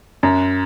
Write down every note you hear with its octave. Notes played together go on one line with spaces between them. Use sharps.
F#2